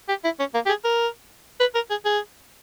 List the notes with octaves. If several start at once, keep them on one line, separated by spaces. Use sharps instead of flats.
G4
E4
C#4
A#3
G4
G#4
A#4
B4
A#4
G#4
G#4